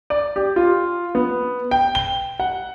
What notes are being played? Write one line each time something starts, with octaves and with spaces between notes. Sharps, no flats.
D5
G4
F4
B3
G5
G7
F#5